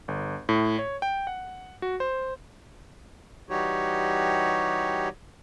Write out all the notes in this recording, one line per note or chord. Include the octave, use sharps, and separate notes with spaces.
G1
A2
C#5
G5
F#5
F#4
C5
E3 G3 D#4 F#4 G4 C#5